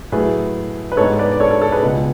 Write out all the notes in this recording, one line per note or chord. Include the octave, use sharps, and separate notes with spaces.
A2 F#3 A3 G#4 B4
B4
G#2 G#3 B3 A4 C#5
B4 D5
D5
A4 C#5
A4
A4
G#4 B4
C#2 B2 G#3